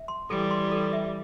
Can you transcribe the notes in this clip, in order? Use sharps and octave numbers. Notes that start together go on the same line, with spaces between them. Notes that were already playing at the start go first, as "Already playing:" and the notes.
Already playing: E5
C6
E3 G3 A4
C6
A4
E5